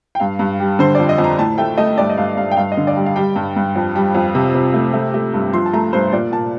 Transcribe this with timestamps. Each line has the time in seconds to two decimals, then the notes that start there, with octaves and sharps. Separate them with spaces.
0.15 G5
0.20 G2 F5
0.39 G2
0.60 G3
0.79 D3 C5
0.95 F2 D5
1.09 D#5
1.18 F2
1.24 A#5
1.39 A2 A5
1.58 A3 G5
1.78 A3 D#5
1.98 G2 D5
2.10 D#5
2.17 G2 F5
2.37 G2 F5
2.51 G5
2.57 G2 F5
2.72 D#5
2.77 D3
2.87 D5
2.96 G3
3.06 F5
3.16 G3 G5
3.36 G2
3.56 G2
3.76 F2
3.95 G3
4.15 F2
4.35 C3
4.55 C3
4.74 A3
4.94 A3
5.14 A3
5.34 G2
5.53 F3 C6
5.66 A5
5.73 A3 A#5
5.93 G2 C5
6.12 A#2 D5
6.32 A#2 A5